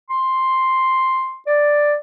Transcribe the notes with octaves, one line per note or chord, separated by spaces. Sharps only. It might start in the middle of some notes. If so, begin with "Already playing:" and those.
C6
D5